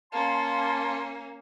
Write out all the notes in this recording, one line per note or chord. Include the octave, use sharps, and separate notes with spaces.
A#3 C#4 F5 A5 C6